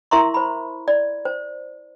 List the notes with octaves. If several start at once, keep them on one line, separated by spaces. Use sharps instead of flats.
E4 A#4 E5 A#5 C6 C#6
C5 B5
D5
C5